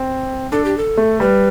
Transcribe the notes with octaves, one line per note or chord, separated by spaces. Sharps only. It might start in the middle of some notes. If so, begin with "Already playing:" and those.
Already playing: C4
D4 A4
G4
A4
A3
G3 B4